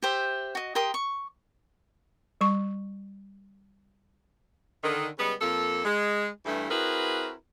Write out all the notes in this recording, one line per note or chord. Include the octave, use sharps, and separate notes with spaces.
G4 C5 E5
F#4 D#5
G4 A#4 C6 D#6
C#6
G3 C#6
D3 D#3
C#3 G3 G#3 B3
F2 A#3 A4
G#3
G2 E3 A3
C4 E4 F#4 G#4 A#4 B4